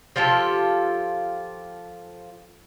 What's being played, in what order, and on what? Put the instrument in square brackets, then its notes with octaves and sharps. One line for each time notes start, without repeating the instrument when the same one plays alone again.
[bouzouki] F3 F4 G4 A4